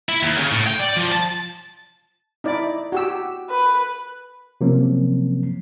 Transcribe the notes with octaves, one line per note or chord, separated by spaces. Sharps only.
E4
D#2
C#3
A2
G5
D5
F3
A5
D#4 E4 D5
F#4 G4 E6
B4
C3 F3 F#3 A#3 C4 C#4